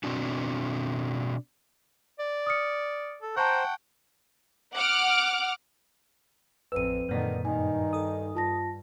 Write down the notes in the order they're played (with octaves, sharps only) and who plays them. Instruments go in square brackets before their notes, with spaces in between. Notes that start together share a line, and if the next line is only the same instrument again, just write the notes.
[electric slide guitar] B2 C4 D4 F#4
[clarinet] D5
[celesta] D#6 F6 C#7
[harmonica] A4
[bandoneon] C5 [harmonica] F#5 G5 [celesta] A5 C#6 [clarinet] A#5
[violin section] F#5 D6 F6
[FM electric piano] A1 E6 [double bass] F2 C4 [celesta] B4 D#7
[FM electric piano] F#2 A#2 [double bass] D3 D#3
[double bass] G2 D#3 [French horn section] D#4 [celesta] G#5
[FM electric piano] A4 D#6
[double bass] G2 [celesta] F4 A5 A#6